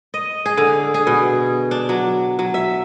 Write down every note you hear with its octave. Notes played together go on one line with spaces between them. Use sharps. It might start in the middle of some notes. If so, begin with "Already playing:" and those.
D#5
G#4
D3
G#4
B2
D4
F#3
F#3
E5